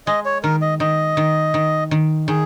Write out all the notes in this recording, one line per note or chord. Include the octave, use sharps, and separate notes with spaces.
G#3 D#5
C#5
D#3 A#4
D#5
D#3 D#5
D#3
D#3
D#3
D#3 G#4